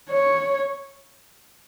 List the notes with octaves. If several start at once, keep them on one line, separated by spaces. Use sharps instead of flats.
C#5